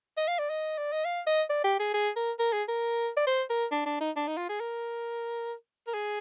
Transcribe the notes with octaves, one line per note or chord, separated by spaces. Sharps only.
D#5
F5
D5
D#5
D5
D#5
F5
D#5
D5
G4
G#4
G#4
A#4
A#4
G#4
A#4
D5
C5
A#4
D4
D4
D#4
D4
D#4
F4
G#4
A#4
A#4
G#4